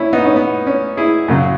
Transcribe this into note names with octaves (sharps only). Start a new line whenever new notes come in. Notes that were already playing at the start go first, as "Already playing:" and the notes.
Already playing: C#4 E4
B3 D#4
C#4
B3
C#4
E4 G#4
F#2 C#3 F#3